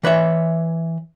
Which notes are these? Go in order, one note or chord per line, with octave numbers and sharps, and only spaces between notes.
E3 B4 C#5 E5